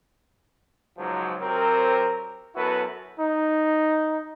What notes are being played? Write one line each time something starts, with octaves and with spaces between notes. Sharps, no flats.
C#2 G#2 F3 F#3
C3 F#3 C4 A#4
F#2 B3 E4 F#4 A4 B4
D#4